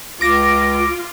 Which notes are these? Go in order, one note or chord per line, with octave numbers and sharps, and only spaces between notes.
C#2 F4 D6 A#6 D7